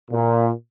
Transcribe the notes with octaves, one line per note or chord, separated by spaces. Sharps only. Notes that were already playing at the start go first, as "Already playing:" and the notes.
A#2